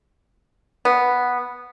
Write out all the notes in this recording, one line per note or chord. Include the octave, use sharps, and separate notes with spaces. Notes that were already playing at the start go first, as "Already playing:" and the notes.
B3